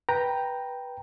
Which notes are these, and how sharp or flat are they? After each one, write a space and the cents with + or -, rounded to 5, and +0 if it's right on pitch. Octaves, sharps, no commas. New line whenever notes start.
B4 -15 G5 +0 A#5 +0